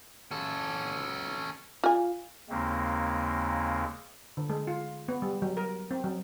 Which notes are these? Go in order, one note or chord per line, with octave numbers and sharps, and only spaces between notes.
C#4 A4
F4 G#5
D#2 C#3 G#3 A#3 C4
D3
G#3
F4
B3
G3
F#3
A#4
C4
F#3